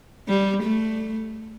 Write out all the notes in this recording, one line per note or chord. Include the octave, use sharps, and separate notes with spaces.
G3
A3